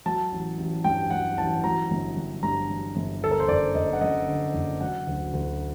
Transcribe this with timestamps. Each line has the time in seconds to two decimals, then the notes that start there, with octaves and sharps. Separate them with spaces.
0.06 F#3 A5
0.32 A1
0.58 A1
0.84 G2 G5
1.10 F#3 F#5
1.37 A1 A5
1.64 F#3 A#5
1.91 G1
2.17 G1
2.43 G2 A#5
2.70 F#3
2.96 G1
3.22 D3 A4
3.31 A#4
3.40 C5
3.48 F#1 D5
3.75 F#1 D#5
3.93 F#5
4.01 F#2 D#5
4.28 D3
4.54 F#1
4.81 F#3 F#5
5.07 D2
5.33 D2